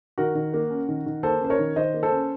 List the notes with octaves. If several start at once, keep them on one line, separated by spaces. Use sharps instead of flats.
D#3 F#4 A#4
D#3
A#3
C#4
D#3
D#3
A#3 A4 C5
C#4 C5
A#4 C#5
D#3
D#3 C5 D#5
A#3
A4 C5
C#4